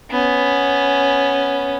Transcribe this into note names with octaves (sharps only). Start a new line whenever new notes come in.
B3 C#4